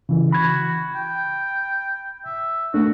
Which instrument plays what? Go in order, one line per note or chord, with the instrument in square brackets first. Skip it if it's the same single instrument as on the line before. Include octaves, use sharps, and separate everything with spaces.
[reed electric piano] C#3 E3
[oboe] F#4 [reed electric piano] B5 G#6
[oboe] G5
E5
[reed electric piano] A3 A#3 D4 [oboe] F#4